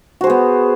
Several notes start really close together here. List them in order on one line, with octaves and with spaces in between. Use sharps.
F#4 C5 G#4 B3